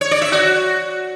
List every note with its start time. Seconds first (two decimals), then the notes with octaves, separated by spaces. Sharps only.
0.01 C#5
0.11 D5
0.22 E5
0.32 F#4